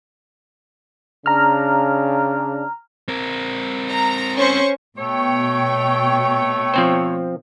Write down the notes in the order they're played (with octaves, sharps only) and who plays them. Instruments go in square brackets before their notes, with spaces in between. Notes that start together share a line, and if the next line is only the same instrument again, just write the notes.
[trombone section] C#3 D4 [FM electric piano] A#5 F6
[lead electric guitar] C4 A#4
[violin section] A#5
C#4 C5 C#6
[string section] B2 G5 [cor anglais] A3 [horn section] C#5
[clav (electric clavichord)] F3 C4 C5